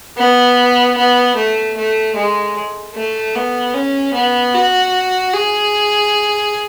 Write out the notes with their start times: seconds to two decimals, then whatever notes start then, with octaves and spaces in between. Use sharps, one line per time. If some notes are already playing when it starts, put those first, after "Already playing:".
0.18 B3
0.97 B3
1.36 A3
1.77 A3
2.15 G#3
2.95 A3
3.35 B3
3.74 C#4
4.13 B3
4.54 F#4
5.33 G#4